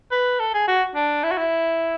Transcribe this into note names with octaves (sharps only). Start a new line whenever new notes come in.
B4
A4
G#4
F#4
D4
E4
F#4
E4